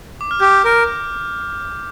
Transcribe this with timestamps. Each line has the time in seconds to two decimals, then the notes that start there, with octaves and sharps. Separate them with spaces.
0.21 D6
0.31 F6
0.40 G4 G6
0.65 A#4